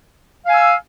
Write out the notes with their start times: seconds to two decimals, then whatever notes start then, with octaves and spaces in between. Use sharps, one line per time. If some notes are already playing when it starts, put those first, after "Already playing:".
0.46 F5
0.50 G#5
0.54 E6